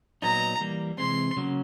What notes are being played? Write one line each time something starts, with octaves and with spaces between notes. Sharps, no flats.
A#2 F#3 B3 D#4 A#5
E3 G3 A#3
C3 E3 G#3 C4 C6
C#3 F#3 A#3 C#4